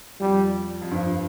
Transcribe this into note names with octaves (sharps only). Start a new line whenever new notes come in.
F2 G3
F2
G2 F3